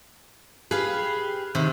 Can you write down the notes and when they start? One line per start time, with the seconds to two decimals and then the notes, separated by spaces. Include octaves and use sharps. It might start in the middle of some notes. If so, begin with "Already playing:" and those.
0.71 G4 G#4 B4 F5
1.55 C3 D#3